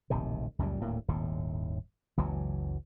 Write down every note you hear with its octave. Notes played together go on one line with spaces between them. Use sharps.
D1 A#1 C3 D#3
C#2 F#2 A#2 G3
D#1 D2 A2 A#3
D#1 G#1 D#2 A2
F#1 C#2 E3 F#3